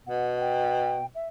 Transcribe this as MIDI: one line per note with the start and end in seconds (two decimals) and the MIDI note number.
0.07 1.08 47
0.07 0.37 78
0.40 1.06 79
1.15 1.28 76